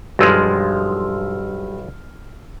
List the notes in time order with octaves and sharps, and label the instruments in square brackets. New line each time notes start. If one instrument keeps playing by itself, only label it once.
[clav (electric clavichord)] B1 F3 G#3 [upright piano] G2 E6 F6